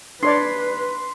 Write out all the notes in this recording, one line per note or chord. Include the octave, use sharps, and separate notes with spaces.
D4 B4 C#5 D5 C6